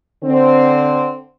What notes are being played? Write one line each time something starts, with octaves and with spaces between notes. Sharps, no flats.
D3 C4